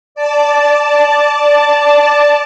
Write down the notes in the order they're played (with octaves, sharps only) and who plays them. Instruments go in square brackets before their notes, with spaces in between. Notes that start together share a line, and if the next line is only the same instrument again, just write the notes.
[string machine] D5 A5